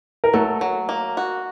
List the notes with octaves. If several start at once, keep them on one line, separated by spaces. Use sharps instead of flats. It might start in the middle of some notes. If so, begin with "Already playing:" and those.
A#4
F#3 A3 A4
F#3
A#3
F#4